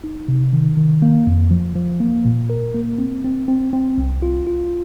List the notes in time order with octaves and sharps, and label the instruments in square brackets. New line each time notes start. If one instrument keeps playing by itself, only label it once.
[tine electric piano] D#4
C3
D#3
D#3
A#3
F2
F3
F3
A#3
A#2
A#4
A#3
C4
C4
C4
C4
C2
F4
F4